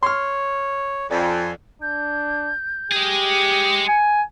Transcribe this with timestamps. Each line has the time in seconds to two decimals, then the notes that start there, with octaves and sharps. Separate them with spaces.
0.03 C#5 C6 F6
1.11 F2 D5 G#5
1.82 D4 G6
2.92 G#3 G4 G#4
3.30 C#7
3.88 G#5